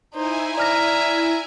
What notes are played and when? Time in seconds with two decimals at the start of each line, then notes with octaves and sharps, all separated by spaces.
0.14 D#4 E4 C5 G#5
0.58 D5 E5 A#5 F6 A#6